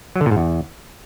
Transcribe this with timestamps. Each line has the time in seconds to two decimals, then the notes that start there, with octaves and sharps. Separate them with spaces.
0.16 F#3
0.21 D3
0.26 A#2
0.31 G#2
0.37 E2